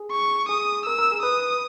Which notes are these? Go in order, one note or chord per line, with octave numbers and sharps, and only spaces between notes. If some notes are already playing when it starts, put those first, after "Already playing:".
Already playing: G#4
C#6
G#4 D#6
A#4 E6
A#4
G#4
B4 D#6